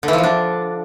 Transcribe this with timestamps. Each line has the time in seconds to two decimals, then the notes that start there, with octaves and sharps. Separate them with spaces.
0.03 D3
0.08 E3
0.13 F3
0.18 D3
0.23 D4